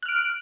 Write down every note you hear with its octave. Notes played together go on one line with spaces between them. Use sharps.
F6 F#6 D7